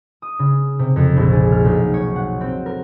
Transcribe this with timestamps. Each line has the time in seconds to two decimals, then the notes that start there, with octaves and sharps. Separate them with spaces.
0.22 D#6
0.39 C#3
0.79 C3
0.96 F2
1.16 A#1
1.32 G#4
1.52 F6
1.64 B1
1.94 C#5
2.16 F#5
2.41 C4
2.66 A#4